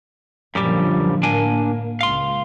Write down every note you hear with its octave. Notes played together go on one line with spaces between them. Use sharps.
F#2 A#2 D3 F3 G3
A2 A#3 D4 G#5
C#2 F5 C6